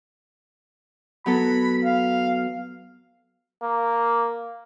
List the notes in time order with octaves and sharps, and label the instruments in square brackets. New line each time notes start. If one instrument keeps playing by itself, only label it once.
[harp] F#3 B3 A4 [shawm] B5
[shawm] F5
[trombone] A#3